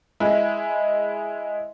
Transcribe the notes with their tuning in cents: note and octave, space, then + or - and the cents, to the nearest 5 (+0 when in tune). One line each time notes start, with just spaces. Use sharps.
G#3 +0 E4 +0